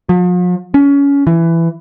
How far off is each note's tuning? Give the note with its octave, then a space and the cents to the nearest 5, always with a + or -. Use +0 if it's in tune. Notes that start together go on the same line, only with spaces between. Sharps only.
F3 +45
C#4 +25
E3 +15